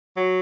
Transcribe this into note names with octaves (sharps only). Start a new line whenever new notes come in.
F#3